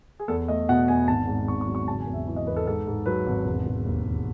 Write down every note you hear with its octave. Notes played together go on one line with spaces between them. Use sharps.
G#4
E2 A4
A3 D#5
B2 F#5
E2 G#5
G#1 A5
G#2
G#1 C#6
C#6
F#3
C#6
C#3 A5
G#5
E2
E5
E3
D#5
E2 B4
A4
G#2 A4
G#2
F#3 B4
G#1
E1
E1
D#2
D#2